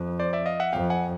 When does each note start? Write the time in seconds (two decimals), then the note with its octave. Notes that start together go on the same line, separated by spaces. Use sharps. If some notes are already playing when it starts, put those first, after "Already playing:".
Already playing: F2
0.19 C5 D5
0.33 D5 E5
0.46 D#5 F5
0.60 E5 F#5
0.73 F2 F5 G5
0.90 F#5 G#5